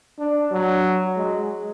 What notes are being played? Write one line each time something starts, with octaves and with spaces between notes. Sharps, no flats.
D4
F#3
G#3